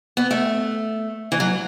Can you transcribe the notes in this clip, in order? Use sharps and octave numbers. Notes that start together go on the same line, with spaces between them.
B3
A3
E3
F#3